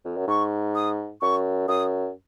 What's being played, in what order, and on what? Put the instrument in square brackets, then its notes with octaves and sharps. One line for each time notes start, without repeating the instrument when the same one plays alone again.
[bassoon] F2
F#2
[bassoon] G#2 [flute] C#6
[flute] D#6
[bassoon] F#2 [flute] C#6
[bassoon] F#2 [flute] D#6